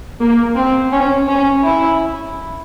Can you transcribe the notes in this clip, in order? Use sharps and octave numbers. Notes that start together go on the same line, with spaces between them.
A#3
C4
C#4
C#4
E4